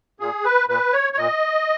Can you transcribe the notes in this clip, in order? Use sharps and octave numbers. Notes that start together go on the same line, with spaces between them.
A#2 G#4
B4
A#2 B4
C#5
C#5
A#2 D#5